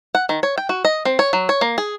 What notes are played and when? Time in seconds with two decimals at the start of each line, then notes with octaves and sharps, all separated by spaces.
0.15 F#5
0.29 D#3
0.43 C#5
0.58 G5
0.69 F#4
0.85 D#5
1.05 C4
1.19 C#5
1.33 F#3
1.49 C#5
1.61 A#3
1.78 G#4